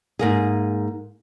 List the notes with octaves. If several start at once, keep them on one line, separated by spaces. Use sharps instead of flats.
G#2 A#3 G#4